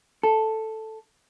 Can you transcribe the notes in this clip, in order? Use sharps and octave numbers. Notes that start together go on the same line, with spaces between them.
A4